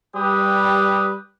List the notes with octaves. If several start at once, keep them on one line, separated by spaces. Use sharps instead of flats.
G3 G4 B4 D#6